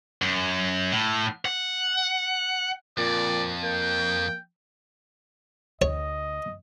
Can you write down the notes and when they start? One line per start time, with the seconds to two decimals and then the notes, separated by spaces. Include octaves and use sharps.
0.22 F#2
0.92 A2
1.45 F#5
2.98 F2 A#2 D5
3.63 A#3 G5
5.82 D2 C#5 D#5